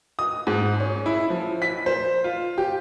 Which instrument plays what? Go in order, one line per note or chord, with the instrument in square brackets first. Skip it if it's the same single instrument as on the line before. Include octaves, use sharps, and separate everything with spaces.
[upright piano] D#6
G#2
C#4
E4
F3
B6
C5
F4
G4